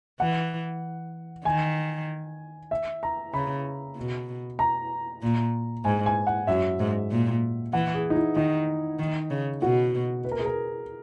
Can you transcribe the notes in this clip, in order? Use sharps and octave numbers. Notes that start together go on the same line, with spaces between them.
E3 F#5
D#3 G#5
E5
A#5
C#3 B5
B2
A#5
A#2
G#2 G#5
G#5
F#5
F#2 E5
G#2
A#2
E3 F#5
G#4
D#4
E4
D#3 D#4
D#3
C#3
B2 F#4
B4
A#4
G#4
A#4